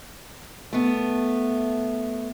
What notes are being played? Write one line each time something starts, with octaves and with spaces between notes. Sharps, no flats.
A3 B3